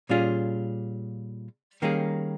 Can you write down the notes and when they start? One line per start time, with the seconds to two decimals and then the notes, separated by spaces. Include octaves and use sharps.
0.09 A#2 G3 C#4 F4 G#4
1.82 D#3 G3 A#3 C#4 G#4